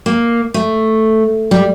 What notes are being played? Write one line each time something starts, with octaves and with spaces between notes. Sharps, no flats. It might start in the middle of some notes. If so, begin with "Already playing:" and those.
A#3
A3
G3